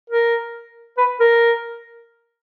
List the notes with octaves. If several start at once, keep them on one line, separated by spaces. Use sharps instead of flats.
A#4
B4
A#4